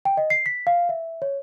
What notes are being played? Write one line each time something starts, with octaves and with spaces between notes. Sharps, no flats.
G5
D#5
C7
B6
F5
E5
C#5